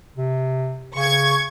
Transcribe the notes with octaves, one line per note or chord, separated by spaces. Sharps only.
C3
C#3 C#6 G#6